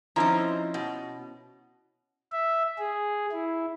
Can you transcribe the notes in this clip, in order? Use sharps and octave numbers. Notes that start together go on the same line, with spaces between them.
F3 C4 C#4 D#4 E4 A#5
B2
E5
G#4
E4